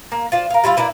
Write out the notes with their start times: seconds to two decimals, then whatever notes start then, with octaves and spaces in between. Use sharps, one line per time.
0.12 A#3
0.32 F4 C5 D5
0.50 A#4 F5
0.64 G3 E4 F4 F5
0.77 A#3 D4 E4 B4